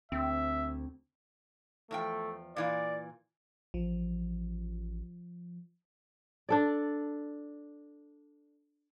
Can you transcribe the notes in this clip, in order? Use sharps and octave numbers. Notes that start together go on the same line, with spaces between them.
D2 C4 E5
E2 F3 A3 G5
A#2 E3 F4 D5
A1 F3
D4 A4 D5